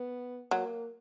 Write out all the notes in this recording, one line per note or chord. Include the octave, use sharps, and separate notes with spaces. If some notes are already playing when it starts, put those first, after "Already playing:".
Already playing: B3
F#3 A#3